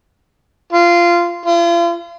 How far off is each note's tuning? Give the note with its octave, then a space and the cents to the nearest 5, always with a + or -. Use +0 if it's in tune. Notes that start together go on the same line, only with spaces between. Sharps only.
F4 -15
F4 -40